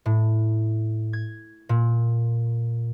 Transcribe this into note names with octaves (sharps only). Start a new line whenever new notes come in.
A2
G#6
A#2